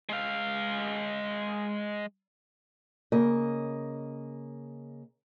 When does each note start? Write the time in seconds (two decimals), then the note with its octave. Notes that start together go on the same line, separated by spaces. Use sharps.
0.09 G#3 F5
3.12 C#3 A#3 D#5